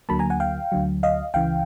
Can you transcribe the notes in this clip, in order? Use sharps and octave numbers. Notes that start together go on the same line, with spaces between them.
D2 D3 F#3 A#3 A5 B5
G#5 A#5
F#5 G#5
F5 G5
D2 D3 F#3
D#5 F5
C#2 C#3 E3 F5 G5